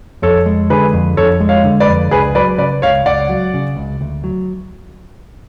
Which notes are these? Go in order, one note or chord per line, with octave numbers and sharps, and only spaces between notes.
F2 A4 C#5
G#3
D3 G#4 B4
F2
F2 A4 C#5
G#3
C#5 F5
D3
B4 D5
F2
C#2 G#4 B4
F#3 B4 D5
C#3 B4 D5
C#2 C#5 F5
C#2 D5 F#5
F#3
C#3
C#2
D2
F#3